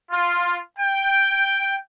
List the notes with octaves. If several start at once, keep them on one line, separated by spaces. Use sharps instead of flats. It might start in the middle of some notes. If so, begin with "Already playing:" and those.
F4
G5